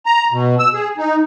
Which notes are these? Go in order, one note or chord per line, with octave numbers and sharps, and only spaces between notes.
A#5
B2
E6
G#4
D#4